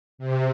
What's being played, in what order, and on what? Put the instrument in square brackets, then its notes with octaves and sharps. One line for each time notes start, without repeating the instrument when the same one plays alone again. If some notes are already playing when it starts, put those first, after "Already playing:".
[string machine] C3